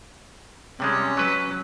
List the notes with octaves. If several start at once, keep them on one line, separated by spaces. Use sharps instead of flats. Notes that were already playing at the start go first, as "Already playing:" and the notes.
C3 G3 G#3 C#4
F#3 B4